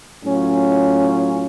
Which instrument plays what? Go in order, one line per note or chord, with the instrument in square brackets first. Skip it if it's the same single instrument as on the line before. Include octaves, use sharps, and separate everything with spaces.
[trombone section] A2 F#3 C#4 F4